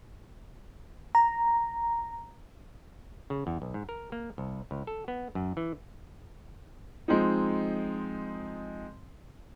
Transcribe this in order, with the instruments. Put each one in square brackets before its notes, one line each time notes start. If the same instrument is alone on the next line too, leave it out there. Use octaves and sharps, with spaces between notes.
[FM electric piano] A#5
[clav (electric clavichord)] C#3
E2
B1
G#2
A#4
A#3
C2
C#2
A4
B3
F#2
E3
[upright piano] F3 G#3 C4 D#4